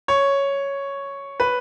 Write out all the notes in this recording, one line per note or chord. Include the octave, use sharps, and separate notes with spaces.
C#5
B4